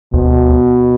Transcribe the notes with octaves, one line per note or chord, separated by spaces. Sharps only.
D2 B2